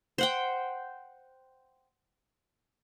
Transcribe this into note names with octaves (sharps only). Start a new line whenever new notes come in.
C5 F#5 G5